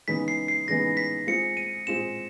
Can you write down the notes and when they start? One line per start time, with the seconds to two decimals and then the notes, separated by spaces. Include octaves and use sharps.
0.08 C#3 E3 G#3 B3 D#4 B6
0.28 C7
0.48 C7
0.68 C#3 E3 G#3 B3 D#4 A#6
0.97 B6
1.27 G#3 C4 F4 G#4 C#7
1.57 D#7
1.87 G#3 C4 F4 G#4 E7